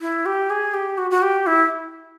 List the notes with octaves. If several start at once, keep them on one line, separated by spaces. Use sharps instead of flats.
E4
G4
G#4
G4
F#4
F#4
G4
E4